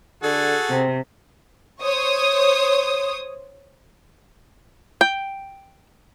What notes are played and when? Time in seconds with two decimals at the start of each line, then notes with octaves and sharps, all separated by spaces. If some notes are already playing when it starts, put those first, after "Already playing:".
0.23 D3 F#4 G#4 A4
0.70 C3 C4
1.83 C5 C#5 D#6
5.01 G5